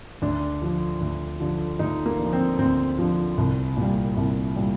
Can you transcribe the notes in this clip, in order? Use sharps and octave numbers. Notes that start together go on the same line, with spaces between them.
D2 D4
D3 F3
D2
D3 F3
D2 D#4
A#3
D3 F3
C4
D2 C4
D3 F3
C2
A#2 G3
C2
A#2 G3